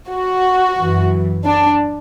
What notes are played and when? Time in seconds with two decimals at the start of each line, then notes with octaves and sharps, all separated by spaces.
0.09 F#4
0.77 F#2 E3
1.45 D4